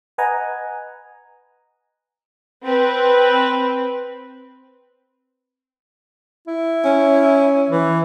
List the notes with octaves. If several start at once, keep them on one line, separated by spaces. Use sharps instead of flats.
B4 D#5 F#5 G#5 A#5
C4 B4
E4
C#4
E3